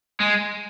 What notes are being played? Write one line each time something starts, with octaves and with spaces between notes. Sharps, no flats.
G#3